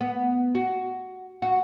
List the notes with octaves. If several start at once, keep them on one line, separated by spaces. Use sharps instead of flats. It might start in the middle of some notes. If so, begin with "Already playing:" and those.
B3
F#4
F#4